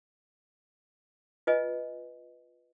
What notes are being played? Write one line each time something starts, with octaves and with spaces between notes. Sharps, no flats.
F4 B4 D#5 G#5